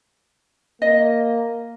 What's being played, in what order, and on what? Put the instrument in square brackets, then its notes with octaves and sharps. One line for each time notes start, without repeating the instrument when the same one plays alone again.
[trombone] A#3 [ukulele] D#5